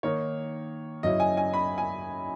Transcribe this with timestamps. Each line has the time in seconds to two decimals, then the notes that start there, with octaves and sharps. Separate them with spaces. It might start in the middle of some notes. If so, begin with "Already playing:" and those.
0.03 D#3 A#3 D#4 C#5
1.03 F#2 C#3 F#3 C#4 E4 D#5
1.20 G#5
1.37 G#5
1.54 B5
1.78 G#5